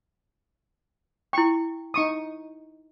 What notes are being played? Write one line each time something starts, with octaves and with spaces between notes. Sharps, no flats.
E4 G5 C#6
D#4 C#6 D#6